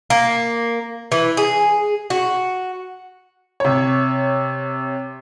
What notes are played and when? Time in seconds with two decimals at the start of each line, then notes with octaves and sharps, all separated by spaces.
0.10 A#3
1.12 E3
1.37 G#4
2.10 F#4
3.60 C3 C#5